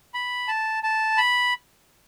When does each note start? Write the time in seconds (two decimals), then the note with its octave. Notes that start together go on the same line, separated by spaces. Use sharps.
0.14 B5
0.48 A5
0.83 A5
1.17 B5